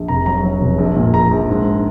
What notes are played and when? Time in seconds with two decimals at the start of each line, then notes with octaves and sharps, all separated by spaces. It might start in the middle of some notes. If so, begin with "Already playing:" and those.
Already playing: A#1
0.08 F1 A#5
0.26 F#3 A#5
0.44 F#3
0.61 F1
0.78 A#1
0.96 A#2
1.13 A#1 A#5
1.31 A#1
1.49 G#2